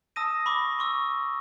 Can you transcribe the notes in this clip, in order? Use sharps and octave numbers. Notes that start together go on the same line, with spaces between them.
A5 D#6 E6 A#6 D#7
B5 C#6 D6
C6 C#6 E6